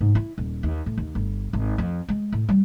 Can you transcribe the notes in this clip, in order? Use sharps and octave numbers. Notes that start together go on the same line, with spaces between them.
G#2
E4
D#1
D#2
A2
D#2
G1
G#1
F2
G#3
A2
G3